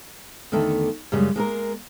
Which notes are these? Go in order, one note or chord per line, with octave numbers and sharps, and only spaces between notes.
E2 D3 D#3 A3
F#2 C#3 G3 G#3
G#3 A#3 A4 A#4